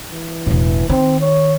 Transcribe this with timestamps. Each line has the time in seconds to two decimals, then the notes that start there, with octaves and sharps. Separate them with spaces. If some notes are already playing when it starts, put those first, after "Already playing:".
0.12 E3
0.46 E1 A2
0.89 D#3 C4
1.20 C#5